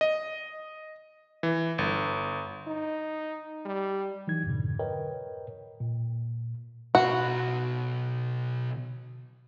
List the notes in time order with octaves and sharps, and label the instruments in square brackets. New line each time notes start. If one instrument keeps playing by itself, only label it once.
[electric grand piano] D#5
E3
G1
[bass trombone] D#4
G3
[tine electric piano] E3 F#3 D#4 G#6
F2 G#2 B2 D3
A#4 B4 C#5 D#5 G5
A#2
[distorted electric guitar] B1 B5 [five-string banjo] F#4